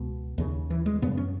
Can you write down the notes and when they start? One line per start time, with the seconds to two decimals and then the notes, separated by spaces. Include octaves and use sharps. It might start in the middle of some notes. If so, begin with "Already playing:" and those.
Already playing: C#2 B2
0.38 D#2 C#3
0.70 E3
0.86 G#3
1.02 F#2 C#3 B3
1.17 C#4